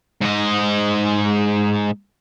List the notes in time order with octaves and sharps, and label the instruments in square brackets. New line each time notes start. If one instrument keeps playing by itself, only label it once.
[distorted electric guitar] G#2 D#5